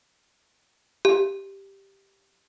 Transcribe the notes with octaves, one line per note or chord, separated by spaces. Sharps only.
G4